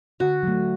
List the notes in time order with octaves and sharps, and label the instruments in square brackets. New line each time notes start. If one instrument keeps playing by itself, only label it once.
[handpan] D3 [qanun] F#4
[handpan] F#3 A3